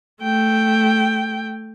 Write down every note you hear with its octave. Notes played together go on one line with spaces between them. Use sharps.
A3 G5